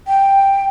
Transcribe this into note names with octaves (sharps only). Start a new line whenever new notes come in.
G5